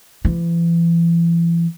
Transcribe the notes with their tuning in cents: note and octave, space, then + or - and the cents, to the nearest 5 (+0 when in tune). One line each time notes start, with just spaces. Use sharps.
E3 +35